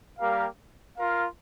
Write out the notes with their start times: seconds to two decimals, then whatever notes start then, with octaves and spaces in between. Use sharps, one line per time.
0.18 G3 A#3 G4 A#4 F5
0.97 F4 A#4 F5